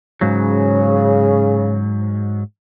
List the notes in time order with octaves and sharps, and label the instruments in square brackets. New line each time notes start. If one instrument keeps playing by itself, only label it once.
[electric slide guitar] G#2 F#3 [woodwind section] C#3